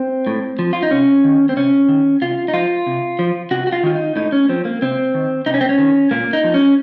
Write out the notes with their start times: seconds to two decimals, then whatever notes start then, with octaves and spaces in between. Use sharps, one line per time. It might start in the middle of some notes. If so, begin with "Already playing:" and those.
Already playing: C4
0.27 A2
0.59 F3
0.73 F4
0.83 D#4
0.91 C3 C#4
1.24 D#3
1.49 C4
1.57 C3 C#4
1.88 D#3
2.21 C3 F4
2.48 D#4
2.53 F3 F4
2.87 C3
3.19 F3
3.51 C3 F#4
3.67 F#4
3.72 F4
3.83 D#3 F4
3.95 D#4
4.16 A2 D#4
4.32 C#4
4.49 F3 C4
4.65 A#3
4.82 C3 C4
5.14 D#3
5.46 C3 D#4
5.54 C#4
5.61 C4
5.69 C#4
5.78 D#3
6.11 A#2 A#3
6.33 D#4
6.44 F3
6.54 C#4